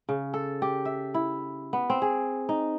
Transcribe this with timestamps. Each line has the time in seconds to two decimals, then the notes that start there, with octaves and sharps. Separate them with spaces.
0.09 C#3
0.34 A4
0.62 G4
0.85 E5
1.14 E4
1.73 B3
1.90 C4
2.02 G#4
2.49 D#4